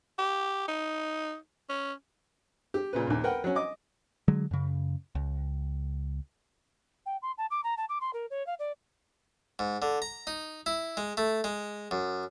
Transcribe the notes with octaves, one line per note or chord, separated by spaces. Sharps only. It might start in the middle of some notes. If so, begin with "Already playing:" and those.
G4
D#4
C#4
G4
A#2 C#3 B4
A#1 D#2
A#4 B4 F#5 G5
F#3 C#4
D#5 D6
D3 F#3 G#3
F#2 C#3
C#2
G5
C6
A5
D6
A#5
A5
D6
C6
A#4
C#5
F5
D5
G#2
D3
A#5
D#4
E4
G#3
A3
G#3
F#2